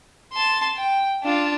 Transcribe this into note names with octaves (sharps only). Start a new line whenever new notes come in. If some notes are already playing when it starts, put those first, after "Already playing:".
A5 C6
G5
D4 F4